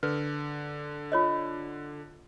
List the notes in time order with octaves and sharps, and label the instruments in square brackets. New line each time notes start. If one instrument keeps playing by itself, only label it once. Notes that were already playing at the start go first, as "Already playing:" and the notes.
[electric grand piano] D3 [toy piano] B4
[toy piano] F4 C#5 D#5